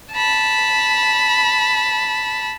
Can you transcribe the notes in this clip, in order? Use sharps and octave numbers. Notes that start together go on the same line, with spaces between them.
A5 B5